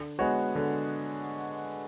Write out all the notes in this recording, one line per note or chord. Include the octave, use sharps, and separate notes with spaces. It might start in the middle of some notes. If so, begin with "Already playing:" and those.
Already playing: D3
G#3 B3 F#4 C#5
D3